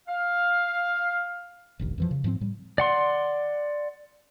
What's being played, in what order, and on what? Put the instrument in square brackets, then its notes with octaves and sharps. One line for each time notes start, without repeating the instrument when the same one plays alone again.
[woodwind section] F5
[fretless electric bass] F1 A#1 D#2
F2 E3 F3
C#3
G#2 F3 A3 C4
A2 G3
[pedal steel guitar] D5 F#5 C6